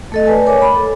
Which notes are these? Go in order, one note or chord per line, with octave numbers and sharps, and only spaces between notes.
A3 A4 D#5
B4 D5 G#5 A5
A#4 C#5 D#5 G#5 D6
B5
A4